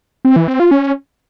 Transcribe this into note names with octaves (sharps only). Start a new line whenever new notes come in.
C4
E3
C4
F4
C#4